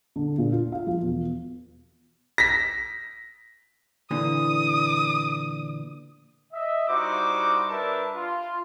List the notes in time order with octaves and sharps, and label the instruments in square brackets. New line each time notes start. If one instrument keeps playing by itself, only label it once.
[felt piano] D3
A#2
F4
F5
F3
E1
[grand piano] A#6 B6
[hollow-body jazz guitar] A#2 D3 E3 [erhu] D#6
[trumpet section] D#5 E5
G3 D#4 E4 F#4 C5 D6
G3 D4 A#4 B4 E5 A5
F4